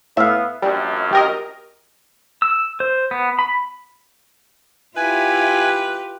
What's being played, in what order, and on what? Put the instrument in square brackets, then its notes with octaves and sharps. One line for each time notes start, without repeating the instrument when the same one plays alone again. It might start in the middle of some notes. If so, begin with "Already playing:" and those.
[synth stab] A2 [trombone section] B3 [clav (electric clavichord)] E5 F5
[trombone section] A#1 F#2 [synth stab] G3
[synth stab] G4 A#4 D#5
[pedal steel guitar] E6
C5
B3
B5
[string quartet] E4 [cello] F4 G4 [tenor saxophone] B4 [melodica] G#5